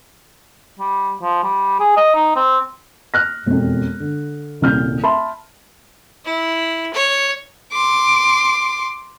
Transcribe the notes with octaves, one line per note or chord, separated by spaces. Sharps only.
G3
F3
G3
G#4
D#5
D#4
C4
F6 F#6 A#6
E1 F2
D3
D#1 C2 F6 G6
E5 A5 B5 C6
E4
C#5
C6 D6